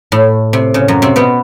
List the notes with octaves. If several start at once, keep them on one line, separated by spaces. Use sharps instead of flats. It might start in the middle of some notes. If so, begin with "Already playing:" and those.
A2
C3
C#3
F#2 F#3
C3 C4
B2 B3